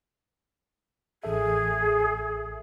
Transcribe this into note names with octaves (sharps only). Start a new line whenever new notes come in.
A1 G#4 A4 E5